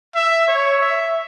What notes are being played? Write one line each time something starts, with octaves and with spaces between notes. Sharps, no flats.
E5
C#5
E5